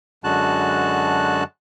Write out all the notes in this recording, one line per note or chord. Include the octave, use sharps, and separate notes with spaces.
F#2 D3 G#3 F#4 A5 F#6